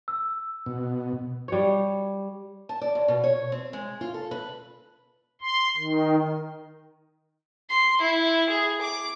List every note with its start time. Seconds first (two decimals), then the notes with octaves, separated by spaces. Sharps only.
0.08 E6
0.66 B2
1.48 G3 C#5
2.69 A5
2.81 D5
2.95 D#2
3.08 B2
3.24 C#5
3.52 C4
3.73 G#3
4.01 F4
4.14 A4
4.31 B4
5.41 C6
5.77 D#3
7.69 C6
8.01 E4
8.49 G#4
8.81 D6